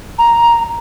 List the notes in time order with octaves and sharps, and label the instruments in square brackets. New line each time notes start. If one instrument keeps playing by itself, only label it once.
[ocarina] A#5